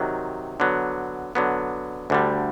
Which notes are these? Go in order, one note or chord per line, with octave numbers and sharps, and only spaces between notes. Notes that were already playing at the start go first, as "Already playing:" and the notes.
Already playing: C3 D#3 F#3
D3 F#3 B3
D3 F#3 B3
D2 D3 G3